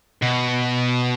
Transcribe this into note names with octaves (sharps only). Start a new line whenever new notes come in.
B2